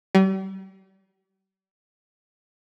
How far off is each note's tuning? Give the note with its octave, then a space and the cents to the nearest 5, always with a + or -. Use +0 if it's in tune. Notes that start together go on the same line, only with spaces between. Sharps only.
G3 -40